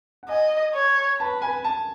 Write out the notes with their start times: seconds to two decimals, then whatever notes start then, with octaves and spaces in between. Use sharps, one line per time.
0.23 F#5
0.29 D#5 G#5
0.74 C#5
1.19 B4 A5
1.42 G#5
1.64 A5